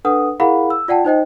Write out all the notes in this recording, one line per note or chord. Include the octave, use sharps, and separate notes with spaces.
D4 A4 B4 F#5 D#6
E4 G#4 A#4 F5 F#5 B5
E6
F4 D5 F#5 G5 A5
D#4 C5 D#5 G5